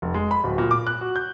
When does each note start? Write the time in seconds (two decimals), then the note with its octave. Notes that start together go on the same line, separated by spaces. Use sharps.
0.02 F1
0.14 G#3
0.31 B5
0.44 D1
0.58 A#2
0.71 D6
0.87 F#6
1.01 F#4
1.16 G6